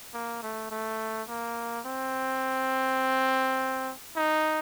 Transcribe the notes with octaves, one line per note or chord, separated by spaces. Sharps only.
A#3
A3
A3
A#3
C4
D#4